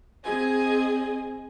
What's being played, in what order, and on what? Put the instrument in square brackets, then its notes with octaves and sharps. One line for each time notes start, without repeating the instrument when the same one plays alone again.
[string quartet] C4 G#4 D#5 G#5